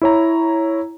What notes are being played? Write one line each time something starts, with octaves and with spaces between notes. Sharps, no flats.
E4 C#5 A#5